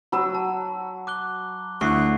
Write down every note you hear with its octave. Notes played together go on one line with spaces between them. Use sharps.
F#3 B5 E6
A5
D6 F#6 G7
D2 E4 C#6 F#6 C7